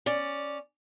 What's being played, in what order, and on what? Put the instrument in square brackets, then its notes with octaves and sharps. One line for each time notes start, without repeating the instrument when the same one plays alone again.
[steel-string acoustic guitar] C#4 D5